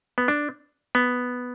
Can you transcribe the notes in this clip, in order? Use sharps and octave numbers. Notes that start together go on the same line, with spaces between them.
B3
D4
B3